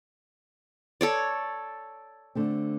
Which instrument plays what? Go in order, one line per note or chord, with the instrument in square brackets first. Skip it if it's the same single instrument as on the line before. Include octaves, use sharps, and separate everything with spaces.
[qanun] A4 C#5 D5
[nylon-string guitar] D3 A3 C4